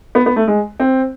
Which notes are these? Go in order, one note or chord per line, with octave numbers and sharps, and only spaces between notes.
B3
B3
A3
G#3
C4